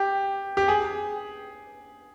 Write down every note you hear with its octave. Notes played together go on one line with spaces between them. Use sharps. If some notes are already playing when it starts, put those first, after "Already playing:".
Already playing: G4
G4
G#4